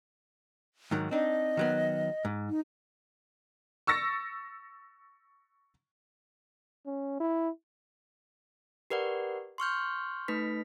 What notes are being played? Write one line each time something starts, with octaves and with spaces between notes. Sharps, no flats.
G#2 D#3 F#3
C4 D4 D#4 D#5
D#3 F#3 B3
G#2
D#4
C#6 E6 A6 A#6 C#7
C#4
E4
G4 A#4 B4 D5 F#5
C6 C#6 F6 G6
A3 D#4 B4 B6